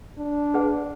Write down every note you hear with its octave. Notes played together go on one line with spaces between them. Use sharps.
D4
G#4 B4 F#5